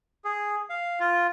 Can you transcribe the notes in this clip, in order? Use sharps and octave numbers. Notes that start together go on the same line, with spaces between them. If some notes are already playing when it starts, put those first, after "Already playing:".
G#4
F5
F4